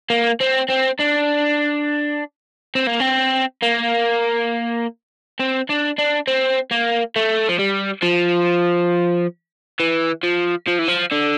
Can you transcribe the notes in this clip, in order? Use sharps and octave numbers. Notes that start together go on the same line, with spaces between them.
A#3
C4
C4
D4
C4
A#3
C4
A#3
C4
D4
D4
C4
A#3
A3
F3
G3
F3
E3
F3
F3
E3
F3
D3